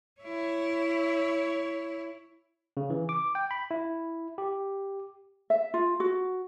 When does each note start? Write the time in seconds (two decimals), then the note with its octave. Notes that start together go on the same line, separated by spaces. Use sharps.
0.21 E4 C#5
2.77 C#3
2.90 E3
3.09 D6
3.35 G5
3.51 B5
3.71 E4
4.38 G4
5.50 E5
5.74 F4
6.00 F#4